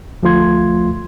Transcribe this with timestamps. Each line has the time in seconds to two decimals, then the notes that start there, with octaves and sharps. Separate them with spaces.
0.23 D2 F3 A3 F4 C6 G#6